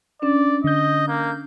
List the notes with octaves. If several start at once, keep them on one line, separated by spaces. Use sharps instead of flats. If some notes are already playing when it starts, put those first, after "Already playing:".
C#4 D4 D5
D3 D#5 G6
A#3